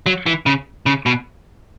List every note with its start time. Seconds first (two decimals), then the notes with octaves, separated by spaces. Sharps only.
0.06 F#3
0.26 E3
0.46 C#3
0.86 C#3
1.06 B2